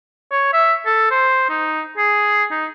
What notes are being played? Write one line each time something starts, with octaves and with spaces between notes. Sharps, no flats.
C#5
E5
A4
C5
D#4
G#4
D#4